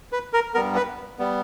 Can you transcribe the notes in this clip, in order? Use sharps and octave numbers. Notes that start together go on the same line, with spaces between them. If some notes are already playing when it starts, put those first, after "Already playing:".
B4
A#4
G2 G3 B3 A#4
B4
G3 B3